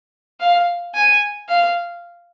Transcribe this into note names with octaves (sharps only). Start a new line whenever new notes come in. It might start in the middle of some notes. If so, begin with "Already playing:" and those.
F5
G#5
F5